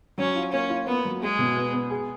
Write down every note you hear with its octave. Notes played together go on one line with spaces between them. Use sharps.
F#3 C#4
F4
A#3 C#4
F4
A#3 B3
F#3
G#3 G#4
B2
B3
B3
G#4